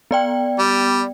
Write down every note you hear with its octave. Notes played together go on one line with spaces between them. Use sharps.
B3 D5 G5
G3